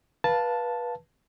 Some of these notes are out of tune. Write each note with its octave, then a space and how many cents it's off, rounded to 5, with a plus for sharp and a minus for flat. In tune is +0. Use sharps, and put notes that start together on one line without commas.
B4 -25 F5 +0 A5 +0